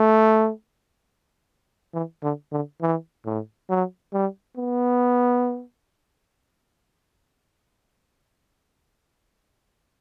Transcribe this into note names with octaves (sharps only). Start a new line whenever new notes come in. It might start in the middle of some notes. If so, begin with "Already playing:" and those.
Already playing: A3
E3
D3
D3
E3
A2
F#3
G3
B3